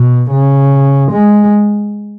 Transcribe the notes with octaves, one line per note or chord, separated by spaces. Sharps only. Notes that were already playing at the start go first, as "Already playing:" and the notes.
Already playing: B2
C#3
G#3